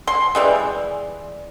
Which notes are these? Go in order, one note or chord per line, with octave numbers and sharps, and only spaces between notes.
C6
E3 G3 G#3